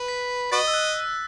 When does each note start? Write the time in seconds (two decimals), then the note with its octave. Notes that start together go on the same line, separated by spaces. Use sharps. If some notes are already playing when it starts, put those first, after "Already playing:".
Already playing: B4
0.08 B6
0.52 F#4 B4 D#5 A6
0.67 E6
0.74 F#6